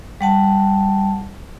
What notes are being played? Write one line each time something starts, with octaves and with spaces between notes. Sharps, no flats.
G3 F#5 A5